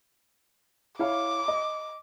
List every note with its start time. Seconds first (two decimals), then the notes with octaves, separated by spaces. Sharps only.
0.99 E4 C#5 F5 D6
1.48 D#5